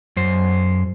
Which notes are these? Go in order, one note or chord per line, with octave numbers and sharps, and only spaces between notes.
F#2 C5